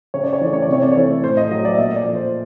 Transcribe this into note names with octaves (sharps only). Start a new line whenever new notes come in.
C#3 C#5
D5
C#5
E3 A3 D5
C#5
D5
C3 C#5
D5
E3 A3 C#5
A2 C5
D#5
F#3 A3 D#5
D5
E5
A#2 D#5
D5
F3 A3
C5